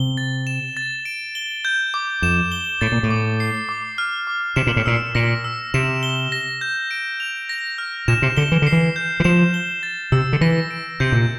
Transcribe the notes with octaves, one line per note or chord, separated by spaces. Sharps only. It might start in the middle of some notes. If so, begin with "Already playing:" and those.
Already playing: C3 G7
A6
E7
A6
D7
G7
G6
D6
F2 E7
G7
A2 A6
A#2
A2
D6
C7
D6
F6
D6
C3 E7
A#2
A2
A#2 E6
A#2 A#6
E6
C3 E7
G7
A#6
G6
D7
F7
A#6
F6
A#2 E7
C3
D3 G7
E3
D3 C7
E3
G6
E3
F3 E7
G7
A6
C3 E6
D3
E3 A#6
D7
C3 G6
A#2